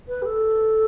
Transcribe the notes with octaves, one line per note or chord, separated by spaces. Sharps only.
B4
G4
A4